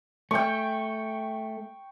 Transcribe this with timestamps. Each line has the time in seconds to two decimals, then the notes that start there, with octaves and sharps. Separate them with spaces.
0.31 A3 G5 C#6